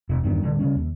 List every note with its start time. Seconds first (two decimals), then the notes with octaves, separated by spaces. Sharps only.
0.09 E1
0.23 E2 G2 D#3
0.43 D1 D3 G3
0.59 C#3 G3 C#4
0.75 D#2